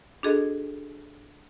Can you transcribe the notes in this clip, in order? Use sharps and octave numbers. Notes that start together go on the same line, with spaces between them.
D4 F#4 G#4 A4 D#5